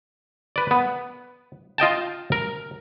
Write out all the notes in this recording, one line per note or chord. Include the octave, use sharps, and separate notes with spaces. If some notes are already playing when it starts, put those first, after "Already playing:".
B4 D5
B3
F4 D#5 G5 A5
A#4